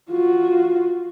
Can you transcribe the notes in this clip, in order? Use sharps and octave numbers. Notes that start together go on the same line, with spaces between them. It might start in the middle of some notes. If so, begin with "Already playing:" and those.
F4 F#4